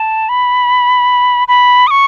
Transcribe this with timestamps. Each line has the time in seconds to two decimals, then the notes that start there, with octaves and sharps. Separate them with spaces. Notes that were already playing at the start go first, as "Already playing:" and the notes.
Already playing: A5
0.29 B5
1.48 B5
1.87 D#6
1.91 C#6